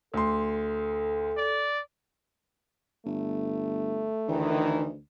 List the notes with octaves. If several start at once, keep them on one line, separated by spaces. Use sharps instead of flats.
D2 A4 C6
D5
G1 A3
D2 D#3 E3